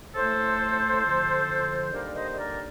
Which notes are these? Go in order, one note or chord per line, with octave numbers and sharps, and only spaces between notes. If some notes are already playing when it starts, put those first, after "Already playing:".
A2 A3 A4 C5
F2 D3 F3
D#2 D3 G3 A#3 A#4 D5
C5 D#5
D#5
A#4 D5